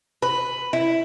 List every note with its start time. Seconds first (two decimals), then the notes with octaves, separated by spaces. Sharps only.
0.22 B4
0.73 E4